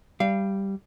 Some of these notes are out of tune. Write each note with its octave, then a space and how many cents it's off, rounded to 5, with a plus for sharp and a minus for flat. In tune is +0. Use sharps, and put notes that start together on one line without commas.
G3 +0 F5 -25